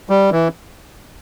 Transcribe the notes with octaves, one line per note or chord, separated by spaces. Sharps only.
G3
E3